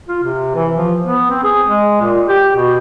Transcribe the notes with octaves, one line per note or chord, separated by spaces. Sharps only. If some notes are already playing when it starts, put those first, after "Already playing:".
F4
C3
E3
F3
B3
C4
G#4
G#3
A#2
G4
B2